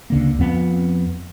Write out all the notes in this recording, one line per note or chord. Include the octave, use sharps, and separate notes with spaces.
C#2 D3 A#3
F2 B3